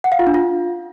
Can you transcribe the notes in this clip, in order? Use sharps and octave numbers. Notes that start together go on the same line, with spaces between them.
F#5
F5
F4
D4
F4